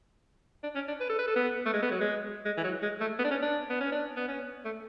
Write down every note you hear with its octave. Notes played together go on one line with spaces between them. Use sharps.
D4
C#4
D4
B4
A4
B4
A4
B3
A3
G#3
B3
F#3
G#3
G#3
E3
F#3
G#3
A3
B3
D4
C#4
D4
B3
C#4
D4
B3
C#4
A3